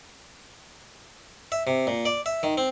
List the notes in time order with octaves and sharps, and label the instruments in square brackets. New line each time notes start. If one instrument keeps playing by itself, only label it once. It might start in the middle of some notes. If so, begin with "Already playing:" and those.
[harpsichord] E5
C3
A#2
D5
E5
D#3
C4